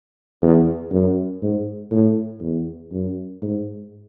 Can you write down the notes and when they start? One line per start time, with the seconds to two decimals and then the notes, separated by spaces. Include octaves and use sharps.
0.42 E2
0.92 F#2
1.42 G#2
1.91 A2
2.41 E2
2.92 F#2
3.42 G#2